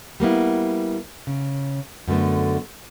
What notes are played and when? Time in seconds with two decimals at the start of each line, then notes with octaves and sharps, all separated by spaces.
0.20 G3 A#3 B3 E4
1.27 C#3
2.08 F#2 D3 A3 B3